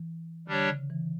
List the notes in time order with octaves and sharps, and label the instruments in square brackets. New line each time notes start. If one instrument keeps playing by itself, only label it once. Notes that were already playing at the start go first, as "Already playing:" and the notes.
Already playing: [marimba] E3
[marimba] D3 [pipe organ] G3 D4 G4 C#5
[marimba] C#3
E3